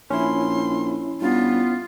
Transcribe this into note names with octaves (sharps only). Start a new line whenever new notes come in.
A#1 C#4 E4 C6
G2 B3 F4